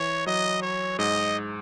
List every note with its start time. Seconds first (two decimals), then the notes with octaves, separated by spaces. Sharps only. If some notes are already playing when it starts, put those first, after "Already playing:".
Already playing: E3 C#5
0.26 F#3 D#5
0.62 C#5
0.99 G#2 D#5